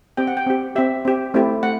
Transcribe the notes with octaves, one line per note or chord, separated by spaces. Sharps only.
C4 G4 G5
F#5
G5
C4 G4
C4 G4 E5
C4 G4
A3 C4 E4 G4
A3 F#5